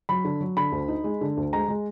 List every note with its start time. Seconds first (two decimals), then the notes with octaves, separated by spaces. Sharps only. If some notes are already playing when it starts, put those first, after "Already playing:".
0.09 F#3 B5
0.25 D3
0.41 F#3
0.57 D3 B5
0.72 D2
0.88 D#4
1.04 G#3
1.21 D3
1.37 D2
1.53 G#3 A#5
1.68 G#3